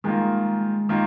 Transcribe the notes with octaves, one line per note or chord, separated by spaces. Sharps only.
D#3 G#3 A#3 F4
D#3 A#3 F4